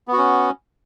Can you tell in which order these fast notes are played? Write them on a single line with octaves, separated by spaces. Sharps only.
B3 F#4 C#4